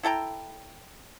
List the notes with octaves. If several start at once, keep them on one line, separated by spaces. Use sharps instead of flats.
E4 A4 G5 A#5